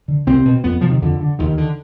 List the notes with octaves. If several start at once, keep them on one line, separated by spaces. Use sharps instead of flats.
D3
C2 C4
B2
F2 B3
C3 F3
D#3
F2 D3
D3
D#2 D#3
D3